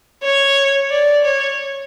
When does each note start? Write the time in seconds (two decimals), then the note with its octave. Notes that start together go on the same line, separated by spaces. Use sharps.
0.22 C#5
0.90 D5
1.24 C#5